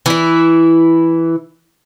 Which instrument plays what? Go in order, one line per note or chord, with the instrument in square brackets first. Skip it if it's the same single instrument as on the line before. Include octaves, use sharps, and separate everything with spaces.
[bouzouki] E3 E4